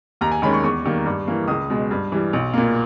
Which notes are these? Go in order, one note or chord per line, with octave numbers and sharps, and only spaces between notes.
D#2 A#5
G#5
D#3 G#3 C#4 B5
C#6
E2 C#6
D#3 G3 A#3
G2
E3 A#3
C#2 D#6
B2 G#3
G2
E3 G3
B1
A#2 A#3